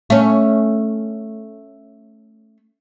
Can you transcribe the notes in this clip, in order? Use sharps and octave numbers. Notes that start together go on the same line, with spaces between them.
A3 C#4